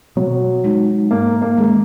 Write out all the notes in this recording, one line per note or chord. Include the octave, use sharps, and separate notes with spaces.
B2 F#3
G#3 D#4
G#2 A#3
A#3
D#3 G#3 C#4 G#4